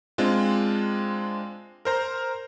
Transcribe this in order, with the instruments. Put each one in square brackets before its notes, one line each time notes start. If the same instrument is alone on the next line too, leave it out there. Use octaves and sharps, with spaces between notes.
[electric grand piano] G#3 C4 D4 F4
A#4 C5 A#5